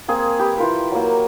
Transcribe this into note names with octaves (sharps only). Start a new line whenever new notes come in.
A#3 C4 G#4
G4 B4
E3 F4 A#4
F#3 A#3